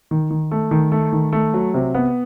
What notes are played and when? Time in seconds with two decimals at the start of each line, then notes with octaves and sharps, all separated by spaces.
0.11 D#3
0.30 D#3
0.51 A3
0.71 D#3
0.92 A3
1.13 D#3
1.33 A3
1.54 F#3
1.74 C3
1.95 B3